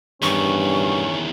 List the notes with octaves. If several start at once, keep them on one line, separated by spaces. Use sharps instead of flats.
E2 G2 D#3 C#4 C#6